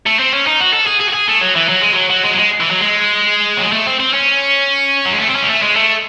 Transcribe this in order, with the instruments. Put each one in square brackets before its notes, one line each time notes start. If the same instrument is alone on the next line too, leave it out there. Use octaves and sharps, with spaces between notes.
[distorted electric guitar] A3
C4
C#4
D#4
F#4
A4
G#4
G#4
F#4
G#4
A3
F#3
E3
F#3
G#3
F#3
F#3
G#3
F#3
G#3
E3
F#3
G#3
F#3
G#3
A3
C4
C4
C#4
F#3
G#3
A3
C4
C#4
G#3
A3
G#3
A3